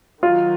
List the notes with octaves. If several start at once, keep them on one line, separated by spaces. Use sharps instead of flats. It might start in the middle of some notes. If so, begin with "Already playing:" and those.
D#3 F#3 F4